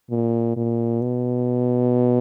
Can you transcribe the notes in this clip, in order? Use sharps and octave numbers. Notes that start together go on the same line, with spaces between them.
A#2
A#2
B2